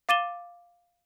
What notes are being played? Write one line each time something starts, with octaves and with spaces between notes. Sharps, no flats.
F5 D6 A6 D#7 E7 G7